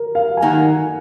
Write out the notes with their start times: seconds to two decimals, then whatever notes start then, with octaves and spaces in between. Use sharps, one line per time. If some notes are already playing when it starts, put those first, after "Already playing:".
Already playing: A#4
0.15 F5
0.37 G#5
0.42 D#3 A#3 D#4 F#5